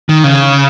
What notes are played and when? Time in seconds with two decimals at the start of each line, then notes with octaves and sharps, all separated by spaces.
0.09 D#3
0.24 C#3